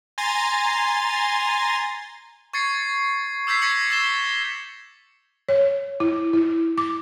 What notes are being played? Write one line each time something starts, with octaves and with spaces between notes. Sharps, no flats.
G#5 A#5 C6 A6
C#6 G#6 A6 C7 C#7
D6 E6 G6 G#6 B6 C7
C#6 G#6 A#6 B6 C#7 F#7
E6 A6 B6 E7 G7
C#5
E4
E4
D6